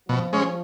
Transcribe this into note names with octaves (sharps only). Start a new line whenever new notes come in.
B2 F3
G#3 C#4